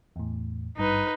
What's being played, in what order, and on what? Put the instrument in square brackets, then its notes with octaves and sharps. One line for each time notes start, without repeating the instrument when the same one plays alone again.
[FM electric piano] E2 A2
[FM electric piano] G#1 G2 [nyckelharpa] D#4 B4